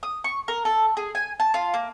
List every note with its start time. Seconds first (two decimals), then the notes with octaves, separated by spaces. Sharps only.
0.03 D#6
0.24 C#6
0.48 A#4
0.65 A4
0.97 G#4
1.15 G#5
1.40 A5
1.54 F4
1.74 A#3